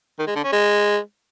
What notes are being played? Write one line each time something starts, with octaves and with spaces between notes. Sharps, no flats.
D#3
G#3
D3
C#4
G#3